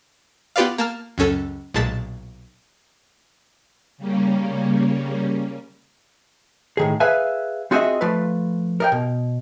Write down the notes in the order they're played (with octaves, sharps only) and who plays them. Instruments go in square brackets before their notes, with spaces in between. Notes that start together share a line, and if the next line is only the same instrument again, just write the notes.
[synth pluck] B3 F4 G4 B4 D5 F5
A#3 A5 F6
C#2 F#2 C#4 A4
B1 A#2 G#3 A5 A6 B6
[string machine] C#3 G3 A#3 C#4
[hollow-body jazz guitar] A2 D#3 G#4
G#4 B4 E5 F5 G#5
C4 F4 F#4 G#4 D#5 E5
F3 A3 F4 B4
A#4 D#5 G5
B2